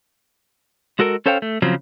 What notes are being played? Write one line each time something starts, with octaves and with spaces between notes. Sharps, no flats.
G#3 F#4 A4 A#4
C#4 A4 C5 C#5 F5 G5
A3
C#3 F3 F#3 C4